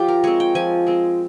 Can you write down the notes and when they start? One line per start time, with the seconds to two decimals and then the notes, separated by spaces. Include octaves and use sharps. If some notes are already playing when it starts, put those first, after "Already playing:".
Already playing: F3 F4 G4
0.08 A#4
0.24 G#3 C4 C#5
0.40 G5
0.55 F3 G#5
0.87 G#3 C4